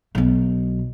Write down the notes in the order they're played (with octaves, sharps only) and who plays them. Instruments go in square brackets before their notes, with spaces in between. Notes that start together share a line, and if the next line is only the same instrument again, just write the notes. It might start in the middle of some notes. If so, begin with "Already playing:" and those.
[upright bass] B1 B2